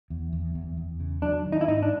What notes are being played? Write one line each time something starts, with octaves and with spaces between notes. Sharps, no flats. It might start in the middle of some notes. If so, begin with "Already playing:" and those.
E2
E2
E2
E2
C#3
F#3 D4
D#3
D#4
E4
G#2 D#4
D4